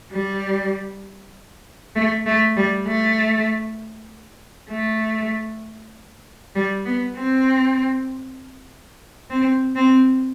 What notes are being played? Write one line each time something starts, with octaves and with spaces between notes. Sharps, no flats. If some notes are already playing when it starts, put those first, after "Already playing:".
G3
A3
A3
G3
A3
A3
G3
B3
C4
C4
C4